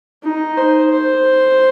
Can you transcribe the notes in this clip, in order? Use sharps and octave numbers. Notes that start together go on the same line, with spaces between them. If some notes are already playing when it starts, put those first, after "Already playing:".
D#4
C5
C5